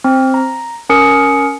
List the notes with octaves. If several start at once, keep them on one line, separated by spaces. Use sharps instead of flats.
C4
A#5
C#4 A#4 D#6 C#7